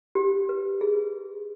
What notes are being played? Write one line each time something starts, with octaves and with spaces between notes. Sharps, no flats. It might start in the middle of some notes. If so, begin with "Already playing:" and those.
G4
B4
G#4